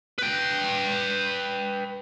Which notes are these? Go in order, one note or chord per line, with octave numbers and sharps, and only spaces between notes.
B4 G5